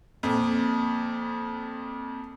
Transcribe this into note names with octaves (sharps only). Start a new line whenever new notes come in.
F2 A#2